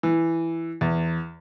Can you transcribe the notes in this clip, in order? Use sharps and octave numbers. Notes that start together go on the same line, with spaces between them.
E3
E2